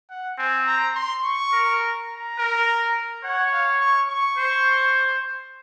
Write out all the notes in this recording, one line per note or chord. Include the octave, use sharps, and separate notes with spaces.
F#5
C4 G#5
A#5
C6
C#6
A#4
A#5
A#4
C#5 F#5
F5
C#6
C#6
C5